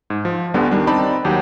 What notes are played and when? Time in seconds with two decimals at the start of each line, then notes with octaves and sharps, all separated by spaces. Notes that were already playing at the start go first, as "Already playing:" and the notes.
0.10 G#2
0.25 F3
0.54 D2 D3 G3 B3
0.71 D#3 G3 D4
0.87 C4 D#4 D5 A5 B5
1.25 D#2 F#3 G4 F#5